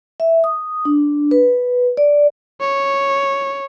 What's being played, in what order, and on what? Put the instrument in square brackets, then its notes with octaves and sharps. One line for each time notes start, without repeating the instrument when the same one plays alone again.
[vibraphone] E5
D#6
D4
B4
D5
[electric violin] C#5